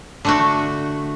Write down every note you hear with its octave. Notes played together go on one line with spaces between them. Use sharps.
D3 A3 F#4